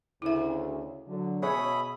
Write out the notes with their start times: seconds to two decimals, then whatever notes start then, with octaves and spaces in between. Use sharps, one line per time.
0.22 D2 C#3 E4 E5
1.07 D3 F#3
1.43 B2 G#4 C#5 E5 G#5 B5 D#6